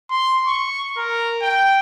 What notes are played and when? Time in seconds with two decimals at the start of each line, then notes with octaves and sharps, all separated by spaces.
0.10 C6
0.47 C#6
0.97 A#4
1.42 G5